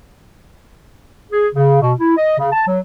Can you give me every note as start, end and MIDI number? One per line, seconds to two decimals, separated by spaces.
1.31 1.49 68
1.54 1.81 49
1.81 1.92 47
1.99 2.13 64
2.17 2.35 75
2.38 2.48 49
2.51 2.64 81
2.66 2.79 54